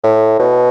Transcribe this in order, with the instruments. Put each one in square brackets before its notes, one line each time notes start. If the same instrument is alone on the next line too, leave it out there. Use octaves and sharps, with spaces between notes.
[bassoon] A2
B2